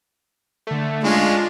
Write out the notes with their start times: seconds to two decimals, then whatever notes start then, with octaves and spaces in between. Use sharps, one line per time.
0.67 D3 A3
1.04 G#3 C#4 D4 F4